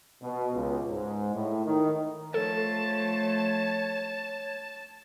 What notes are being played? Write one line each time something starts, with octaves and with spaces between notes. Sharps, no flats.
B2
C#2
G#2
A2
D#3
F3 A3 A4 C#5 A5